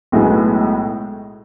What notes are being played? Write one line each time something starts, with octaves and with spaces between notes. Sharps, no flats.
B1 A2 G#3 B3